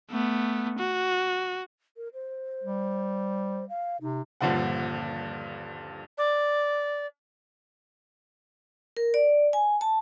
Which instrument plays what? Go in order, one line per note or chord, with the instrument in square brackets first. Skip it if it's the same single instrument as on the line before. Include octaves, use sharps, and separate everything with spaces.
[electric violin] A3 B3
F#4
[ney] A#4
C5
[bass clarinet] G3
[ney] F5
[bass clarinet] C3 [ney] D#4
[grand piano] D#1 G2 A#2 D3 F3 F#5
[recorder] D5
[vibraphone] A#4
D5
G#5
A5